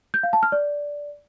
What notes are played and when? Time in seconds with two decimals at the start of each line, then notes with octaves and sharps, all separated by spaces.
0.14 G6
0.23 F5
0.33 A5
0.43 F6
0.52 D5